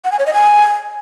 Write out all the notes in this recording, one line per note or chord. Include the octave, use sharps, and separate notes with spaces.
F#5
G#5
C#5
D#5
G#5